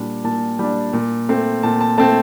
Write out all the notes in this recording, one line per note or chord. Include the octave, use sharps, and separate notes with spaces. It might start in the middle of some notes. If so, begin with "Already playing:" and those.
Already playing: A#2 G3 D4
A#2 A5
G3 D4
A#2
A3 C4
A#2 A5
A5
A3 C4 A5